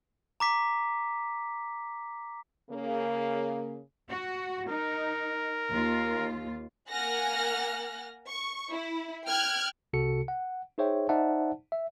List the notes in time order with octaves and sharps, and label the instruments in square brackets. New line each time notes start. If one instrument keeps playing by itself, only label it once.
[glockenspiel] A#5 D6 B6
[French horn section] C#3 A#3
[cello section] F#4
[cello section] D#4 [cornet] A#4
[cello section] D#2 F4
[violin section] A#3 F#5 G#5 F6 F#6 A#6
C#6
E4
G5 F6 F#6 G#6
[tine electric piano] C2 C3 F#4 A4 C#7
F#5
D#4 G#4 C5 C#5 E5 G5
D#4 C5 D5 E5 F#5 A5
E5